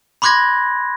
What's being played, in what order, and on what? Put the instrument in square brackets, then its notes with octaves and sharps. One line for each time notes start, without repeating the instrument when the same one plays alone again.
[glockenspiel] B5 C6 D6 F#6 G#6 A#6